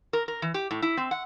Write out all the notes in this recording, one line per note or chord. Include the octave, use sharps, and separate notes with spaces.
A#4
A#4
E3
G4
A2
E4
C4
F#5